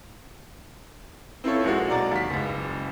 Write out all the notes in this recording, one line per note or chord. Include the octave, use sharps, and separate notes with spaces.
C4 E4 F4 A4 C#5
A#1 G#3 A#3 F#4
B1 F#4 D5 A#5 A6
D#2 B6
F#1 C#2